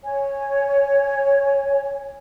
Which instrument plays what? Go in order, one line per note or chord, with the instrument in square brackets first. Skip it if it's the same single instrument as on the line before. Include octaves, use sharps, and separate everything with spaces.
[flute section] C#5 G#5